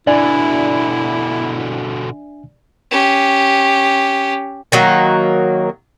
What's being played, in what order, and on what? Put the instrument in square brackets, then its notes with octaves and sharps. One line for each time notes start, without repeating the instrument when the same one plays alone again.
[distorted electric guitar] B2 D3 [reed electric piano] D4 E5 G#5 [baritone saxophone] E4 [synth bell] D5
[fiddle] C#4 G4
[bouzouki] D#3 F#3 A#3